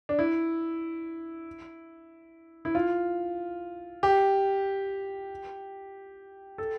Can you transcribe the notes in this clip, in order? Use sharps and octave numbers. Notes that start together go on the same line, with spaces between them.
D4
E4
E4
F4
G4
A4